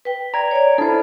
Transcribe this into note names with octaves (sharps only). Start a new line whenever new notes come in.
B4 G5
D5 A#5 G#6
C#5 D5
D4 E4 A4 C5